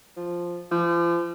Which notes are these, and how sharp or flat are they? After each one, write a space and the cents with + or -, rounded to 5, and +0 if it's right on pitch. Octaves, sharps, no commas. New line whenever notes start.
F3 +0
F3 -35